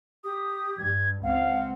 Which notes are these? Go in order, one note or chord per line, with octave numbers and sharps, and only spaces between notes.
G4 D#6
G2 G#6
C#2 C4 F5 F#5